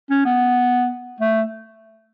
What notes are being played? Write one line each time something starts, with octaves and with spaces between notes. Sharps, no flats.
C#4
B3
A3